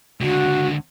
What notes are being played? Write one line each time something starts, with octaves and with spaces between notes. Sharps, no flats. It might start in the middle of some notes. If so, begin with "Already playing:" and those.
C#2 D3 F#4